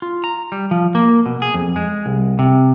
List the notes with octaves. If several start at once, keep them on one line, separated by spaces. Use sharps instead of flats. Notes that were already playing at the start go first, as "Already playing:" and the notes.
F4
A#5
G3
F3
A#3
B2
G#4
F2
G#3
C2
C3